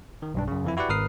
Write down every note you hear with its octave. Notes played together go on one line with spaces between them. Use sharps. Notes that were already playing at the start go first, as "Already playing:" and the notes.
D#3
B1 G2 D4
F#2 C#3
F2 E3 E4
E4 F#4 G4 B4 D5 F#5
G#1 A#4 B4 D#6 F6 C7